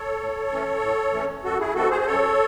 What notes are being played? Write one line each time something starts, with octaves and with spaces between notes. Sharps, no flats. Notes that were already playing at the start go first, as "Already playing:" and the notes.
Already playing: A4 C#5
A2
E3 A3 C#4
A2
E3 A3 C#4
F#2 F#4 A4
E4 G#4
D#3 A3 C4 F#4 A4
G#4 C5
C5
F#2 A4 C#5